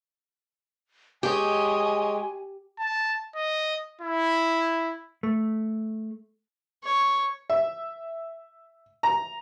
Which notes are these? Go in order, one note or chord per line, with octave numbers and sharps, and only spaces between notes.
G#3 G4 C#5 D#5 G#5
A5
D#5
E4
A3
C#5
E5
A#5